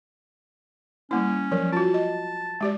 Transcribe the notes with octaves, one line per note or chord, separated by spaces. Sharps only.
G3 A#3 C#4 E4
F3 F#3 A#4
F4 F#4 A5
D#5
G#3 G4 D5